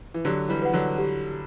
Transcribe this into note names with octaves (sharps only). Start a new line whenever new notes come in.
E3
D3 F#3 G4
E3 G3
B4 F#5
D3 F#3
G4